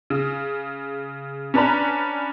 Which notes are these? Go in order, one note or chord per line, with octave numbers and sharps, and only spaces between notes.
C#3
C#4 D4 B4 D5 A#5 B5